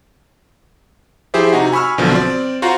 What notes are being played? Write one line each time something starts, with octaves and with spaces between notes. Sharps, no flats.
F3 E4 G4 G#4 C5 E5
C3 D#4 F#4
G#5 B5 C#6 E6 F6
A#1 B2 D3 F3 F#3
C4 D5
F4 F#4 C5 F#5 A#5